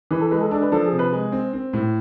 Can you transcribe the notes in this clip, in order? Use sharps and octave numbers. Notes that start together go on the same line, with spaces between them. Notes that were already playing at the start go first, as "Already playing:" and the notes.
E3 B4
A4
G#3 B4
A4
D4 A4
B4
F3 A4
G#4
C3
B4
G#3
C4
C4
A2